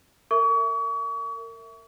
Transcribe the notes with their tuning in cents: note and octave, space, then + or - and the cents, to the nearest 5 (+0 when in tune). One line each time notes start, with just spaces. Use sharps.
A#4 -30 E5 +0 C#6 +40